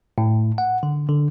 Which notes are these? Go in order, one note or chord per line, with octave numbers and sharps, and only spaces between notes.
A2
F#5
D3
D3